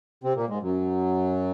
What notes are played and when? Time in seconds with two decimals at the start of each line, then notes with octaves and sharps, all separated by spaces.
0.24 C3 C4
0.36 A#2 A#3
0.49 G#2 G#3
0.63 F#2 F#3